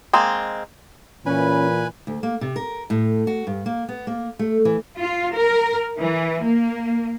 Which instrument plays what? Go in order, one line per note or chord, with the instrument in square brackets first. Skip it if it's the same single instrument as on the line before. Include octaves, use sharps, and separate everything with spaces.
[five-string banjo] G#3 A#3 C4
[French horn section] A#2 E3 [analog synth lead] C#4 [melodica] B4 G#5 B5
[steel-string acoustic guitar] D2
A#3
C3
A#4
A2
F#4
G2
A#3
B3
A#3
A3
E3
[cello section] F4
A#4
E3
A#3